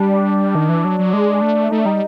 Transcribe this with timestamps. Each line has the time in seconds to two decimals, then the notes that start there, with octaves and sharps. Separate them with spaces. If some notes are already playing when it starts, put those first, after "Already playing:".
Already playing: G3 D4
0.55 D#3
0.69 E3
0.85 F#3
0.99 F#3
1.13 G#3
1.42 A3
1.71 A3 D#4
1.79 D4
1.86 G3 D#4